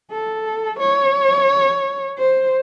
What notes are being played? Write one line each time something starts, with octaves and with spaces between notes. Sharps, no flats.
A4
C#5
C5